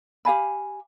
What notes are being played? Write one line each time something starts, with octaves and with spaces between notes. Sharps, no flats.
G4 F5 G#5 B5